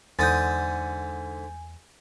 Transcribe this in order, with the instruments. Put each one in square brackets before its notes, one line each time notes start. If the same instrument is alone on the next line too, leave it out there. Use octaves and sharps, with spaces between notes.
[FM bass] E2 [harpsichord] G#2 D3 D#6 [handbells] G#5 [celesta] G6 A6